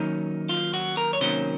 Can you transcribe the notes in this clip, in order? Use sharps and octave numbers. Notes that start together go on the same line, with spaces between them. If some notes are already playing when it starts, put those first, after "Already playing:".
Already playing: D#3 F#3 A#3 C#4 D#4
F4
F#4
A#4
C#5
C3 D#3 F#3 A#3 C#4 C5